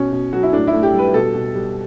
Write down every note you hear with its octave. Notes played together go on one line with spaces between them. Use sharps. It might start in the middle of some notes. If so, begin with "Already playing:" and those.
Already playing: B2 C#4
B2
F#3 F#4
E4
A2 D4
E4
A2
G4
G3
B4
B2 A4
B2
G3